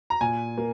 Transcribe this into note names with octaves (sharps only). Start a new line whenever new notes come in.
A#5
A#2 G#5
A#3